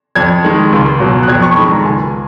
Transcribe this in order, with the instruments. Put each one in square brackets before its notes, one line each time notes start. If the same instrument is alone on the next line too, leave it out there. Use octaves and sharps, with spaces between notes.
[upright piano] F2 G#6
D#3 G#3
C#2
B2 F#3
F#6
F2 G#6
C#6
D#3 G#3 B5
A#5
C#2 G#5